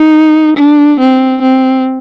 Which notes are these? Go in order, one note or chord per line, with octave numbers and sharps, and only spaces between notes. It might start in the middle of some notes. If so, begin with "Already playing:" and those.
Already playing: D#4
D4
C4
C4